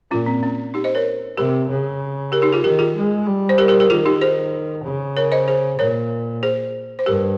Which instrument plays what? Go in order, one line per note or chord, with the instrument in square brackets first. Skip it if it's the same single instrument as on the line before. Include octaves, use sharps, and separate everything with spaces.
[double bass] A#2 [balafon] C#4 F4
[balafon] C4
C#4
D#4 G4
C5 D#5
A#4 C#5
[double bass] C3 [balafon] G4 A#4
[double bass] C#3
[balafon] G4 A#4
D#4 G4
F4 G#4
[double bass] D#3 [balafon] G4 A#4
[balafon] F4 G#4
[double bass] G#3
G3
[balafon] C5
G4 A#4
G4 A#4
G4 A#4
[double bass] D#3 [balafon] F4 G#4
[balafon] D#4 G4
G#4 C5
[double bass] C#3
[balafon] A#4 C#5
C5 D#5
G#4 C5
[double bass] A#2 [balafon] A#4 C#5
[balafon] G#4 C5
C5
[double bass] G2 [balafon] G4 A#4